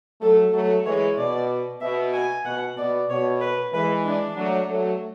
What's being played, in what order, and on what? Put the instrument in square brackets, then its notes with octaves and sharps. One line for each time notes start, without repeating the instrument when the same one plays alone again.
[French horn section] F#3 A3 [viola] A4
[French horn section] F#3 A3 [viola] A4
[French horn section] E3 G#3 [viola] C#5
[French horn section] B2 [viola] D5
[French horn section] B2 [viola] E5
[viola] G#5
[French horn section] B2 [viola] F#5
[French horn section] B2 [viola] D5
[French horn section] B2 [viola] C#5
[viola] B4
[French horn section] E3 G#3 [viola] B4
[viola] D4
[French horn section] F#3 A3
F#3 A3